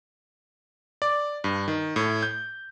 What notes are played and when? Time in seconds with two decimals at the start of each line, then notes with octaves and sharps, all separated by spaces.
1.02 D5
1.44 G2
1.68 D#3
1.96 A2
2.23 G6